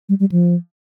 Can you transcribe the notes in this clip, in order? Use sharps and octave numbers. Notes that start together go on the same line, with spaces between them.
G3
G3
F3